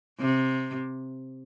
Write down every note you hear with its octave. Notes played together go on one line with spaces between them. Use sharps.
C3